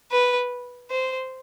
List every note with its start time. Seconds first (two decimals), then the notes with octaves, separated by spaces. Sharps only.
0.11 B4
0.91 C5